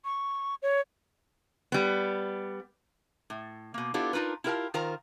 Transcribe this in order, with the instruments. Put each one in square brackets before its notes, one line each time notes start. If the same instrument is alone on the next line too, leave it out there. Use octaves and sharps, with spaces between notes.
[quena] C#6
C#5
[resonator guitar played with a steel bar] G3 B3
A2
B2 A#3
B3 D4 E4 F4 G4 A4
D4 D#4 F4 A#4 B4
E4 F4 G4 A#4 F5 A5
D#3 F4 A#4 C5 A#5